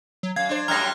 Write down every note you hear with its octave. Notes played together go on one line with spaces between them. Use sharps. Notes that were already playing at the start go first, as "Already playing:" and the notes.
F#3
F#2 F5 G#6
D4 C5
F#2 A2 G3 A#5 F6 F#6 A#6